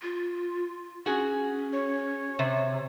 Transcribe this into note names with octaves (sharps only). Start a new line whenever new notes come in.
F4
C#4 F#4 G#4
C#5
C3